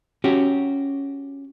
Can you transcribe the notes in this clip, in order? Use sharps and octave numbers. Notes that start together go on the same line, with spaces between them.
C#4 F#4 G4